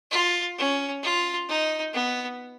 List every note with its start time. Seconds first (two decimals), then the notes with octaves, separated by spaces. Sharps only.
0.11 F4
0.58 C#4
1.03 F4
1.49 D#4
1.94 B3